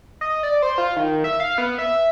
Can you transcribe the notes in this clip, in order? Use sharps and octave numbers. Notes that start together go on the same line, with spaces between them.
D#5
D5
C5
F4
D#3
E5
F5
B3
E5